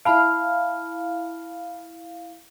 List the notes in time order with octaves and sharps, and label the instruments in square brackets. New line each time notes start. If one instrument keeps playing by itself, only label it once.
[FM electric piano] E4 F5 [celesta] A5 B5 F6